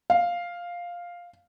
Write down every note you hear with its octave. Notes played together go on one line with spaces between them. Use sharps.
F5